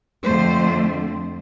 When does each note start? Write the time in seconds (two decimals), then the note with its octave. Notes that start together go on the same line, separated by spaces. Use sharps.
0.24 F2 D3 A3 C5